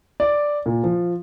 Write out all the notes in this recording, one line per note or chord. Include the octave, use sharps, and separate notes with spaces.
D5
A#2
F3